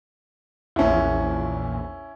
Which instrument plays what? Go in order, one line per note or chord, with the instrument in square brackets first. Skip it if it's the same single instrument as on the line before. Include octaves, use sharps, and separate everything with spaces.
[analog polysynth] A#1 E2 [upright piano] C#4 E4